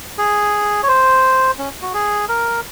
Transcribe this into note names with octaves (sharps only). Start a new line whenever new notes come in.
G#4
C#5
C5
C#4
F#4
G#4
A#4